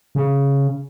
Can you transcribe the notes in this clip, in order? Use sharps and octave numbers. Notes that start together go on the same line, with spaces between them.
C#3